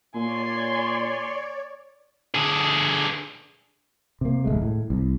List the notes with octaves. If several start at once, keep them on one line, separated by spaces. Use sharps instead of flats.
A#2 C#5 D5 G#5 C6
D3 G#4
C3 A#3
D#1 G#1 G#3 A3
A2
C2